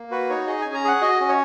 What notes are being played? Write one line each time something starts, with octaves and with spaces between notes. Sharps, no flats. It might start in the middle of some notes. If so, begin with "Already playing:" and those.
Already playing: A#3
F#4 B4
D#4 C#5
G#4 D#5
C#4 G#5
A#5
G#4 F#5
F#4 D#5
C#4
C#5